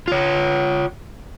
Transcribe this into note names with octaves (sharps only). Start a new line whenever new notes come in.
F4 C#5